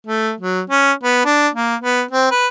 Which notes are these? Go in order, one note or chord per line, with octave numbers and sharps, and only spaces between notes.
A3
F#3
C#4
B3
D4
A#3
B3
C4
B4